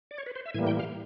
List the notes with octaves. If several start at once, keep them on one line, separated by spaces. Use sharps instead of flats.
D5
C#5
B4
C5
E5
A2 E3 G3 A#3 G#5
G5
F5